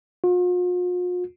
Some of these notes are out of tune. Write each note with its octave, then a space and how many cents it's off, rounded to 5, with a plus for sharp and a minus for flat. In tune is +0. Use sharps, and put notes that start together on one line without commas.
F4 +45